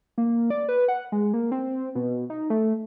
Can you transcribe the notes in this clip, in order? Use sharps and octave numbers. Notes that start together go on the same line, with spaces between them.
A#3
D5
B4
F#5
G#3
A#3
C4
B2
D#4
A3